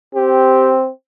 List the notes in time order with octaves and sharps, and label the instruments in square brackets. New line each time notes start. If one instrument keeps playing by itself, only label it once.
[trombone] C4 [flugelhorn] G4